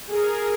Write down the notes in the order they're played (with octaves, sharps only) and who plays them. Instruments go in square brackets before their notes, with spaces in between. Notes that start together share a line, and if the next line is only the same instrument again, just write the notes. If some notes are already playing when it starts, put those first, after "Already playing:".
[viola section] G#4 A#4